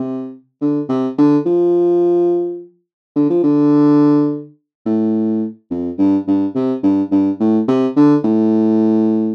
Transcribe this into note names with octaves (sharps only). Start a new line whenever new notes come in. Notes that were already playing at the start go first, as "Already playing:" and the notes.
Already playing: C3
D3
C3
D3
F3
D3
F3
D3
A2
F2
G2
G2
C3
G2
G2
A2
C3
D3
A2